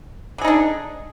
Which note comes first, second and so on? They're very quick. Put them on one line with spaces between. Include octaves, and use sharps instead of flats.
D3 G#4 D#4 D4